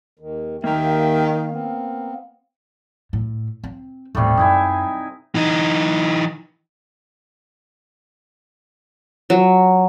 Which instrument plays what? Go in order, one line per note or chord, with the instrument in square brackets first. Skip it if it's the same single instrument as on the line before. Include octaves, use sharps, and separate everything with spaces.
[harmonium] D#2 D#3
[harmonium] D#2 E5 G5 [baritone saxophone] D#3 [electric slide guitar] A#3 A#4
[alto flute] F5
[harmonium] B3 C4
[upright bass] A2
C4
[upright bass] D#1 A2 [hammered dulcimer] C3 G3 A3
[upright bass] F#2 [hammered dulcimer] D#4 E4 G#5
[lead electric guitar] E3 D#4
[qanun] F#3